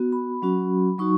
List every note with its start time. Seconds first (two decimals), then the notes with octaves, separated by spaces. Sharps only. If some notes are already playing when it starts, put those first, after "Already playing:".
Already playing: B3 F#4
0.13 B5
0.42 F#3 C#4 F#4
0.98 F#3 D#4 F#4 C#6